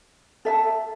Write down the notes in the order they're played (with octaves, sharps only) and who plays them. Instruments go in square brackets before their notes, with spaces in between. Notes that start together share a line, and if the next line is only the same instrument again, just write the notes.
[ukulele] A4 E5 A5